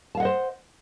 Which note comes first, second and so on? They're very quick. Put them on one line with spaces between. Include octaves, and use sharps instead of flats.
A5 F5 F#5 D#5 C5